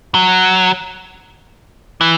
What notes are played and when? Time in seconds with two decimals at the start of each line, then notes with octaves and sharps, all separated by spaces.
0.15 F#3
2.01 E3